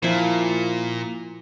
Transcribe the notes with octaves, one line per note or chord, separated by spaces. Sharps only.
A#2 F3 E4